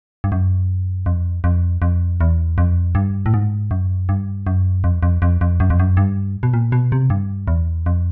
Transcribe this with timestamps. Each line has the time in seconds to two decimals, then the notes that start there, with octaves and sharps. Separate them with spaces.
0.24 G2
0.32 F#2
1.06 F2
1.44 F2
1.82 F2
2.21 E2
2.58 F2
2.95 G2
3.26 A2
3.34 G#2
3.71 F#2
4.09 G2
4.47 F#2
4.84 F2
5.03 F2
5.22 F2
5.41 F2
5.60 F#2
5.70 F2
5.79 F#2
5.97 G2
6.43 B2
6.54 A#2
6.72 B2
6.92 C3
7.10 G2
7.48 E2
7.86 F2